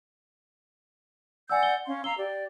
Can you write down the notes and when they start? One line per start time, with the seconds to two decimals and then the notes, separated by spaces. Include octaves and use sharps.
1.49 D5 F#5 G#5 E6 G6
1.63 G7
1.86 C#4 F5 C6
2.04 F5 A#5 E6 G7
2.17 G4 D5